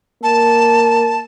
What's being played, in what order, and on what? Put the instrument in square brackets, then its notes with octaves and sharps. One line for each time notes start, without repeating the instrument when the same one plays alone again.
[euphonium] A#3 [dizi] A5